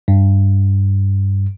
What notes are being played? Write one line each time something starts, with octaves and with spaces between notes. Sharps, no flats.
G2